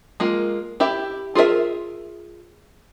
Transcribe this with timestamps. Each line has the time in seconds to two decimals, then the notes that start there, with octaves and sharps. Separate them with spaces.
0.20 G#3 A#3 F4
0.80 E4 G4 E5
1.35 F4 G#4 A#4 C#5 E5